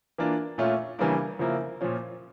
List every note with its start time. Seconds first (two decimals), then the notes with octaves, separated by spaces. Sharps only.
0.18 E3 A#3 D4 F4
0.58 A#2 A3 C#4 F4
0.99 C#3 E3 G3 A#3 D4
1.39 C#3 F3 A#3 E4
1.81 A#2 F3 C#4